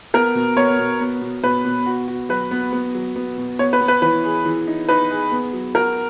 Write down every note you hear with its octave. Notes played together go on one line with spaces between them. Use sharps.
B3 A#4
B2
B3 C#5
B2
B3
B2
B2 B4
B2
F#4
F#4
F#3 B4
B3
B3
F#3
B3
B2
B3 C#5
B4
B3
B4
E3 B4
G#4
E3
D#4
D#4 B4
G#4
B3
F#3
F#4 A#4